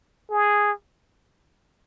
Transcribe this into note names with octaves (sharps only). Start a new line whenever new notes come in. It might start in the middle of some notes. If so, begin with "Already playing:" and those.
G#4